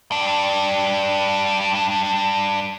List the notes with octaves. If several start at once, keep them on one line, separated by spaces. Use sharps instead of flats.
G2 D4